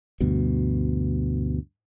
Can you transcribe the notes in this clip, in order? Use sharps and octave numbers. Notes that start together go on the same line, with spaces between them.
D2 G2 B2